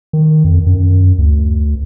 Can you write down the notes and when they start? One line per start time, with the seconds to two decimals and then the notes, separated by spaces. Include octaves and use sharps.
0.13 D#3
0.44 F2
0.66 F#2
1.18 D2